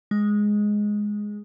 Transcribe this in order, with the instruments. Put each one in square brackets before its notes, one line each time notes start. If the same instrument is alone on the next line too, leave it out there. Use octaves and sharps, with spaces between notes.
[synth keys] G#3